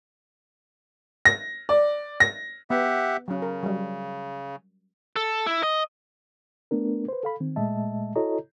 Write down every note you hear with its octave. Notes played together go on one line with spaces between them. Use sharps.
A#6
D5
A#6
B3 G4 E5 F#5
C#3 F#3 C#4
A#4
F#3 G3
A4
E4
D#5
A3 B3 D4 A#4
B4 C5
A4 F5 B5
D#3 C4
A#2 G#3 A3 D#5 E5 A5
E4 F#4 A4 C#5 D#5 A#5